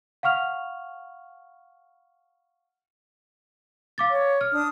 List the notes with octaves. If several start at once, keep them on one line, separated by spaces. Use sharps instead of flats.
F5 F#5 C#6 F6 F7
F5 D6 A6
C#5
F6
D4 D#6